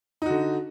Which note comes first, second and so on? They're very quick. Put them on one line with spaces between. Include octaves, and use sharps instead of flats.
D#4 F#4 D3